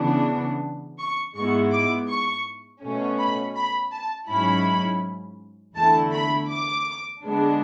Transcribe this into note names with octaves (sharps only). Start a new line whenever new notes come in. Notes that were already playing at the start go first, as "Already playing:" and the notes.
Already playing: C#3 E3 B3 D4
C#6
G#2 G#3 B3 E4 C#6
D6
C#6
B2 A3 C#4
B5
B5
A5
G#2 F#3 C#4 E4 B5
E2 D3 A3 E4 A5
B5
D6
D3 G#3 B3 D4